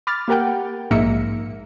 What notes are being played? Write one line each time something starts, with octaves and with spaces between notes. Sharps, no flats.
B5 D6 F6 A6
A#3 G4 A#4 F#5 G5
A#1 G#2 A#3 E5 A#6 C#7